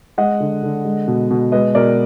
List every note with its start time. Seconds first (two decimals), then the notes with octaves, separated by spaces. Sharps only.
0.18 G#3 D#5 F#5
0.40 D3
0.63 D3
0.85 G#3
1.08 B2
1.31 B2
1.52 G#3 B4 D#5
1.75 B2 A#4 D5